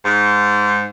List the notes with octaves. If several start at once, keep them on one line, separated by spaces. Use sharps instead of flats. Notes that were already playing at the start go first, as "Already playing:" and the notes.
G#2